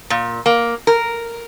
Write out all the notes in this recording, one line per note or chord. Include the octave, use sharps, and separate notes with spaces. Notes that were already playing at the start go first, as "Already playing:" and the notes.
A#2
A#3
A#4